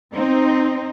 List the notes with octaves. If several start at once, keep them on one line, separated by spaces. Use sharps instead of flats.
C4 D#4